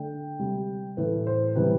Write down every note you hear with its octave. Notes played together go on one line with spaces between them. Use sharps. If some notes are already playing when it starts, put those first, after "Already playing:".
Already playing: D3 A3 G5
C3 G3
A2 E3 A3 B4
C5
C3 E3 G3 B4